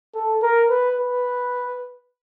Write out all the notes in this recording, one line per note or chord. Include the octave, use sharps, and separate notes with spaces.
A4
A#4
B4
B4